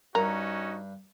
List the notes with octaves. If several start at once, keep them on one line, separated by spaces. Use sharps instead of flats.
G2 C#4 D#4 F#4 A#4